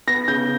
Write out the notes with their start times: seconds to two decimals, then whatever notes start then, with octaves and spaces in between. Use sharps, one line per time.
0.07 B3 A#6
0.28 C#3 G6